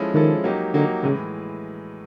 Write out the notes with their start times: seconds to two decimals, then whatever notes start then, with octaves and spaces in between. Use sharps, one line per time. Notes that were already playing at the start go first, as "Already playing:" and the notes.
Already playing: F3 G#3 C#4 E4 A4
0.14 D#3 F3 G#3 C#4 E4 A4
0.44 F#3 A#3 D#4 G4
0.74 D3 F#3 A#3 D#4 G4
1.03 A2 C#3 E3 G#3